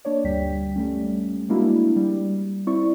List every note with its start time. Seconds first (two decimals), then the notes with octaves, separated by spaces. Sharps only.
0.05 A#3 D4 C#5 D5
0.24 D2 G2 G3 G5 B6
0.76 G3 A3 C#4
1.49 G#3 A#3 D4 E4 F#4
1.96 G3
2.67 C4 E4 D5 C#6